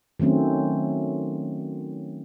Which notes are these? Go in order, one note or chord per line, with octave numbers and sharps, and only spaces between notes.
D#3 F#3 A3 C4 C#4